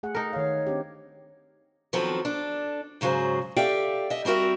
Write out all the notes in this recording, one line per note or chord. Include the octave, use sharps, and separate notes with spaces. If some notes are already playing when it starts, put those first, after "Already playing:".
A3 G#4 F#5
D#4 A#4
D#3 C#5 F5
C4 D4 G4
D#3 F3 F#3 B3 C4 A4
D4 A4
G#2 C#3 F#3 G#4 C5
G4 A4 D5 E5 F5 G5
D#5 E5
G3 C4 F#4 A#4 E5